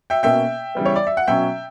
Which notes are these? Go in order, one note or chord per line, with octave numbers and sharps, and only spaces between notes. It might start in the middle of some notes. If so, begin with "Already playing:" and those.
E5 G5
B2 A#3 C#4 E5 G5
C#3 E3 G3 B3
C#5
D5
E5
F#5
B2 F#3 C#4 E5 G5